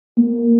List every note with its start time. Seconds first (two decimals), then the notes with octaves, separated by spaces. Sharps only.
0.17 A#3